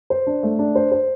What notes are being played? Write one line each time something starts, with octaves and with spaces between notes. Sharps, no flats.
C5
D4
A3
D4
C5
C5